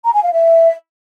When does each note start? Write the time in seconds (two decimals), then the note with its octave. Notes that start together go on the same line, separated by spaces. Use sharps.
0.04 A#5
0.13 G#5
0.23 F5
0.32 E5